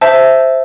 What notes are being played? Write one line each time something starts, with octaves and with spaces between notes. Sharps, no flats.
C5 E5 A5 E6